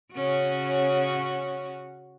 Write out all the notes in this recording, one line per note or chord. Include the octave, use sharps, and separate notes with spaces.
C#3 C#4 F#4